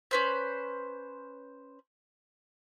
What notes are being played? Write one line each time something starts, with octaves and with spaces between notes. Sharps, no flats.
C#4 B4 C5